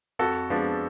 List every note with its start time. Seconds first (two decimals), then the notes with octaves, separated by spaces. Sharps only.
0.19 F2 F#4 A4
0.50 F3 G#3 B3 D4